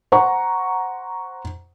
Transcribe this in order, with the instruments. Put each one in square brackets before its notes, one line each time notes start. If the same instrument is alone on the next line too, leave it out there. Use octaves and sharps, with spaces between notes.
[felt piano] C5 F#5 A#5 C#6